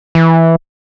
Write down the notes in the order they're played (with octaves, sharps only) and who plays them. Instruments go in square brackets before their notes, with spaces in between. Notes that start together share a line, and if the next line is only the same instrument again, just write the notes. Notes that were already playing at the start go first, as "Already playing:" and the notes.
[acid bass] E3